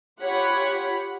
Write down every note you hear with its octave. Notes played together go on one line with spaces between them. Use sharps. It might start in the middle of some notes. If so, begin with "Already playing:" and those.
F4 G4 C#5 F#5 B5